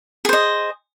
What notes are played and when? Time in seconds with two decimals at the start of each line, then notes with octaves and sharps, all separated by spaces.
0.25 G#4
0.29 C5
0.33 D#5